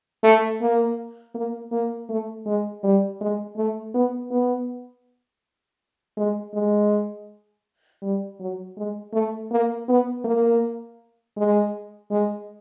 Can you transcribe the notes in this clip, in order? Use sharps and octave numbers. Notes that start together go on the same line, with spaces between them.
A3
A#3
A#3
A#3
A3
G#3
G3
G#3
A3
B3
B3
G#3
G#3
G3
F#3
G#3
A3
A#3
B3
A#3
G#3
G#3